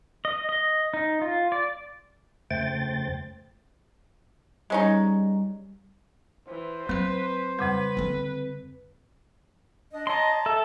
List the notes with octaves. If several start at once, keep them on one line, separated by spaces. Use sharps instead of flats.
D#5
D#5
D#4
F4
D5
F2 C#3 A3 C5 G5 A6
G3 G#3 C#4 D#4
E3 C5
F#3 C4 B4 C6
F2 C#3 G3 B4
D3 C4
D4 D#5
C#5 D#5 A5 A#5 C6
A4 E5